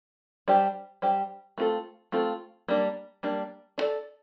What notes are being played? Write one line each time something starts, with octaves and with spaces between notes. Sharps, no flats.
G3 D4 G4 C5
G3 D4 G4 C5
A3 C4 F4 A4
A3 C4 F4 A4
G3 A#3 D4
G3 A#3 D4
D4
A4 D5